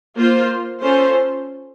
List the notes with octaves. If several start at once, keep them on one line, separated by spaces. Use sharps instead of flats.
A#3 F4 C5
C#4 F4 A4 C5